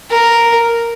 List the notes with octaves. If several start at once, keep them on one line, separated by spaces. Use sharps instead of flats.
A#4